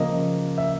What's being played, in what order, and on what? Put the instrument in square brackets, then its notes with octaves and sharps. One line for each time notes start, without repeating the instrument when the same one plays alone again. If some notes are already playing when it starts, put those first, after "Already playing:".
Already playing: [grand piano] C#3 F3 A#3 D#5
E5